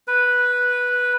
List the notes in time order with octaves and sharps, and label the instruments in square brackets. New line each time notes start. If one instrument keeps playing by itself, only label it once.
[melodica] B4